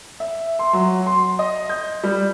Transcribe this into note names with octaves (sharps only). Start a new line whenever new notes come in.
E5
C6
F#3
C6
D#5
G6
G3